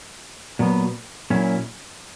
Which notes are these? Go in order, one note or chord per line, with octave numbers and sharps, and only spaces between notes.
A#2 F#3 B3
A#2 F#3 C#4 E4